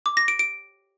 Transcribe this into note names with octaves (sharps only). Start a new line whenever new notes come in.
D6
A#6
D7
D7